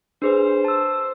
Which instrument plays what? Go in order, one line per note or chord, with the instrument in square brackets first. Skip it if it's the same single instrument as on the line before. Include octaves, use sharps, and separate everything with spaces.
[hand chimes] D4 G#4 B4 [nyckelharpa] C5
[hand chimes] A5 E6